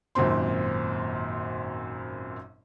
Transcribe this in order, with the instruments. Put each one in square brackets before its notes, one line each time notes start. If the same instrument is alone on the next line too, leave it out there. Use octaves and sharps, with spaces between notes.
[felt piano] G#1 F#2 A#2 C4 C6